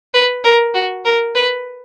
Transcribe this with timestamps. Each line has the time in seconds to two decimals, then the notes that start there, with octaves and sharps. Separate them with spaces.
0.14 B4
0.44 A#4
0.74 F#4
1.05 A#4
1.35 B4